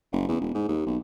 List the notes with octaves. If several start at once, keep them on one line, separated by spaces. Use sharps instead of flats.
F#1
E2
E1
G#2
D#2
B1